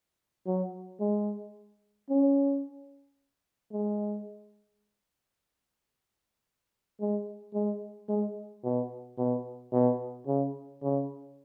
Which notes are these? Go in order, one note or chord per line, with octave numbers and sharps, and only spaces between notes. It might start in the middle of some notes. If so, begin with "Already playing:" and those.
F#3
G#3
C#4
G#3
G#3
G#3
G#3
B2
B2
B2
C#3
C#3